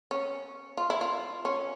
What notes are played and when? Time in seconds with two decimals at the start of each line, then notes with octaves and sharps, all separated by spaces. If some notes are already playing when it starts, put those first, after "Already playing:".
0.11 C#4
0.77 F4
0.90 E4
1.01 F4
1.45 C#4